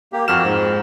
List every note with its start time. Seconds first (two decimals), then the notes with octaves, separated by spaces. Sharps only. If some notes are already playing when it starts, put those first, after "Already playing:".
0.13 A#3 G4
0.28 F2 F#4 F6 E7
0.43 G#2